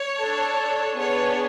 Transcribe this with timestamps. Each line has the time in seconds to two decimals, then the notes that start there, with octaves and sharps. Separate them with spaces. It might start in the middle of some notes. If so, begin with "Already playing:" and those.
Already playing: C#5
0.18 D4 A4
0.97 B3 D4 G#4 C#5